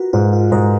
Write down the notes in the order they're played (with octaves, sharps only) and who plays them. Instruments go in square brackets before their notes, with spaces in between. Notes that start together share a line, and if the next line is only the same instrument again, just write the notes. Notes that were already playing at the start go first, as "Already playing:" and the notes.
Already playing: [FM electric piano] F4 F#4 A#4 B4
[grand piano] G#2 [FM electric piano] F4
[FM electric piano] F4
[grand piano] G#2 [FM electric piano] A#4